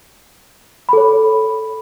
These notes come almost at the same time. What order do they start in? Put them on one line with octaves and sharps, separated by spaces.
B5 A4 C#5